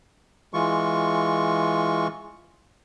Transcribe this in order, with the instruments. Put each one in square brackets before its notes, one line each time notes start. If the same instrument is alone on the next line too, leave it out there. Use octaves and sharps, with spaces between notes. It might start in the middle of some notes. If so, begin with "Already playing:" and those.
[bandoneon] E3 G#3 F4 C#6